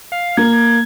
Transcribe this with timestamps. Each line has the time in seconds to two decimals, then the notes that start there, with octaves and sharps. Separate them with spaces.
0.12 F5
0.37 A#3 G#6